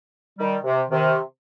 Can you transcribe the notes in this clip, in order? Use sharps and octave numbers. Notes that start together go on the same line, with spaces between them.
D#3 G3
C3
C3 D#3